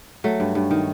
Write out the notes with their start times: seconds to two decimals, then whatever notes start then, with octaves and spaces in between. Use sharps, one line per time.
0.24 F#3 A3
0.40 G2
0.55 G2
0.71 D#3